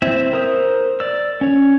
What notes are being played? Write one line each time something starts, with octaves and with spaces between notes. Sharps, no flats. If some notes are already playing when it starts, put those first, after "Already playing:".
C4 E4 E5
A#4 C5 D#6 E6
D5 E6
C#4 C#5